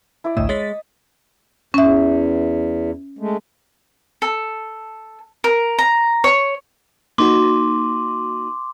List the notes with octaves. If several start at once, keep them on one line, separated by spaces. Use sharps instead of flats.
E4 D5
A1 D2 A2 D#5 E6
G#3 C#5 A6 B6
E2 C#4 E5
G#3 A3
A4
A#4
A#5
C#5
A#3 D#4 F#4 C6 D6